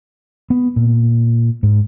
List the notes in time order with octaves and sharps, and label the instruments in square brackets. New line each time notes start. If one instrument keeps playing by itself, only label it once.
[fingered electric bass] B3
A#2
G#2